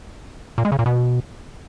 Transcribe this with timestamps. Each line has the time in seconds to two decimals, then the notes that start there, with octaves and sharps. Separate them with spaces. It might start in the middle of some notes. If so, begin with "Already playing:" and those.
0.58 A#2
0.65 G#3
0.72 C#3
0.79 A#2
0.86 B2